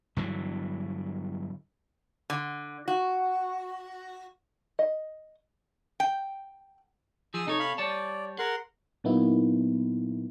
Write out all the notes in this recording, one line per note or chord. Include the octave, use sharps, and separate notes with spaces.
G2 D3 E3 F#3
D3
F#4
D#5
G5
F3 G#4 D#6 E6
C3 D#4 A4 C#5
F5 B5
G3 C#5 D5 A5
G#4 A#4 F#5 C6
A#2 F#3 A#3 B3 D#4 E4